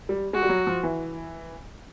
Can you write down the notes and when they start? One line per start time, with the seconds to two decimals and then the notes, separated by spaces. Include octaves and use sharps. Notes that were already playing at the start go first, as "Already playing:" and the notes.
0.09 G3
0.33 G#3 F#4
0.43 G3
0.49 F#3
0.67 F3
0.83 E3